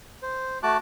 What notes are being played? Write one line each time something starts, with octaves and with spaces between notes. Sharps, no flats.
C5
A3 F#4 A5 D6 F#6